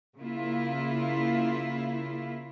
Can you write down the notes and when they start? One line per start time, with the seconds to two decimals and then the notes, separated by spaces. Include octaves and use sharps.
0.18 C#3 A#3 E4 F4